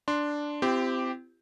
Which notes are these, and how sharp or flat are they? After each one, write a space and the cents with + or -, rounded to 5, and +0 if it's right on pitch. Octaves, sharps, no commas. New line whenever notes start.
D4 +0 C6 +0
C4 -20 E4 +45 G4 +0